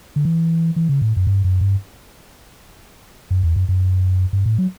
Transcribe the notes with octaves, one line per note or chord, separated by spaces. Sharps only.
D3
E3
E3
C#3
A2
F#2
G2
F#2
G2
F#2
E2
F#2
F#2
G2
A2
F#3